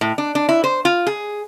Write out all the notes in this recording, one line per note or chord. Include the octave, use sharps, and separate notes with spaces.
A2
D4
D4
E4
C5
F4
G#4